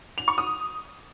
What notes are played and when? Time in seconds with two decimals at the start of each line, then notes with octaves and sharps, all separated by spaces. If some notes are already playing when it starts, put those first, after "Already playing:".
0.18 F7
0.28 C#6
0.38 D#6